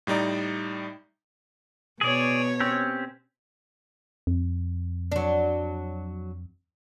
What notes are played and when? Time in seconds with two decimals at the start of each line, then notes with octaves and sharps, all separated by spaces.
0.07 A2 G3 D#4 D5 A#5
2.01 B2 G#4 C#5 D5
2.60 C4 C#4 G4
4.27 F2
5.12 F#3 D4